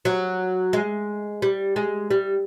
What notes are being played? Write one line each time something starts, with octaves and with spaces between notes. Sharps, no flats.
F#3
G#3
G3
G#3
G3